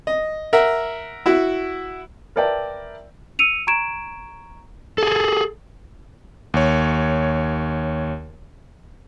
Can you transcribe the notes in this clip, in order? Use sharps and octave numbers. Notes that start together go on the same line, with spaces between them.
D#5
A#4 E5 F#5
E4 F#4
A#4 B4 D5 E5 G5 A5
E6 C#7 D#7 F7
A#5 C#6 G#6 D7 E7
G#4 A4
D#2 C#5